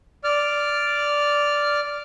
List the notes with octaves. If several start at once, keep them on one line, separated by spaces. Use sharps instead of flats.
D5 F6